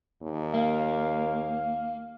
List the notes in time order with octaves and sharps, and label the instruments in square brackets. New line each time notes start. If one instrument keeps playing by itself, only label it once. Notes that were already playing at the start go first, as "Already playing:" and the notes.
[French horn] D#2
[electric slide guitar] A#3 [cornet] F5